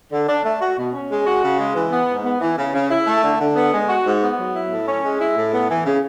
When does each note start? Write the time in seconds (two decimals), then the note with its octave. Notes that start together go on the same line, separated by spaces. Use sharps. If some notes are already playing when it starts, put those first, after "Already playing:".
0.11 D3
0.27 D4
0.43 A3
0.60 F#4
0.76 B2
0.93 C#4
1.10 G#3
1.25 F#4
1.42 C#3
1.59 G#3
1.74 E3
1.91 B3
2.08 G#2
2.24 B3
2.40 E3
2.57 C#3
2.73 C#3
2.90 E4
3.07 A3
3.22 D3
3.39 D3
3.55 B3
3.72 G#3
3.88 F#4
4.05 G#2
4.21 B3
4.38 F#3
4.54 E4
4.70 A2
4.87 C#4
5.03 G#3
5.19 E4
5.36 A2
5.53 B3
5.69 E3
5.85 C#3